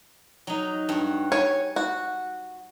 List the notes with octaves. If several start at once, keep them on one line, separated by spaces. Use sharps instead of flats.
F#3 D#4
G2 F#4
C#5 G#5
F#4